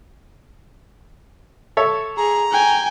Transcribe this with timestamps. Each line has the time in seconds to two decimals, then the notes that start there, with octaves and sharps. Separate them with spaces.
1.77 A4 C#5 E5
2.17 G#4 A#5
2.52 G5 G#5